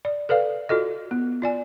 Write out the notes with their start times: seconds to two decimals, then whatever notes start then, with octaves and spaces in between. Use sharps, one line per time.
0.05 D5
0.29 A4 B4 D5 F5
0.69 F4 F#4 A4 D#5
1.11 B3
1.42 F4 D5 G#5